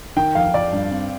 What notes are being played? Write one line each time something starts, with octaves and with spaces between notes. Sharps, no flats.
D#3 G5
F2 F5
F2 D5
G2
C4